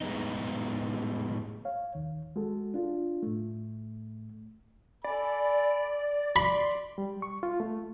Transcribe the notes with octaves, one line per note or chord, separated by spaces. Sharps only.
A2 G3 G#3 B3 D#4
C#5 F5
D#2 D#3
G#3 F#4 A4
D4 F4
A2 A3
A4 D5 G#5 B5
D5 B5 C6
G3
C#6
F4
A3